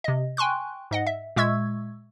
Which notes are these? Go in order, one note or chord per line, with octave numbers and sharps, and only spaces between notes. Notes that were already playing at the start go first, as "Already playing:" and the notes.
C3 D#5
G5 G#5 C6 C#6 F#6
G#2 D#5 F#5
E5
A#2 G#3 E5 C#6 E6 G#6